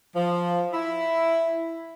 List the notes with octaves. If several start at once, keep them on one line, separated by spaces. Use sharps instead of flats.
F3
E4